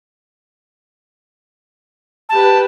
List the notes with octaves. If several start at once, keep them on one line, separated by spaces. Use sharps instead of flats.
G4 B4 A5